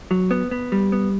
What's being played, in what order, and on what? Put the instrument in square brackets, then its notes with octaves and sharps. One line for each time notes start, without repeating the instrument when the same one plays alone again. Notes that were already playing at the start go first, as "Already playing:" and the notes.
[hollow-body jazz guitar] F#3
B3
B3
G3
B3